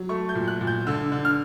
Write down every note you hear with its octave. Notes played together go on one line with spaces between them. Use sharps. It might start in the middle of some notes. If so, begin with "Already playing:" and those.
Already playing: F#3
A3 C#6
G6
A#2
F#6
A#2
G6
D3 E6
D3
F6